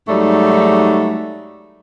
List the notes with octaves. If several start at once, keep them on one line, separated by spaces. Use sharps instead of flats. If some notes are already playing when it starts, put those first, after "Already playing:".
G#2 F#3 G3 A3 D#4